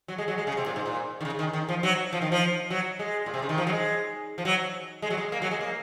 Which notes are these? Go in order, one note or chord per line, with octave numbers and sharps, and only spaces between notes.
F#3
G#3
F#3
G#3
C#3
C3
A#2
G#2
A#2
D#3
C#3
D#3
D#3
F3
F#3
F3
D#3
F3
F#3
G#3
A#2
C3
C#3
D#3
F3
F#3
G#3
F3
F#3
G#3
F#3
G#3
A#3
F#3
G#3
A#3